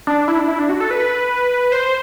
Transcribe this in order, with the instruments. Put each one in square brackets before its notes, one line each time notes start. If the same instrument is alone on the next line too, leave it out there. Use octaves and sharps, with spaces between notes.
[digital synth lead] D4
E4
D4
E4
D4
F#4
A4
B4
C5